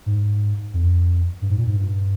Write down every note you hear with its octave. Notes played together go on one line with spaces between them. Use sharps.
G#2
F2
G2
G#2
A#2
G#2
G2